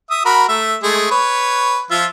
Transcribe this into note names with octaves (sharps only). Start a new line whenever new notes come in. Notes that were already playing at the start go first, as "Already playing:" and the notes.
E5 D#6
F#4 A#4 B5
A3 E5
G#3 A3 G#4
B4 C#5
F3 F4 E5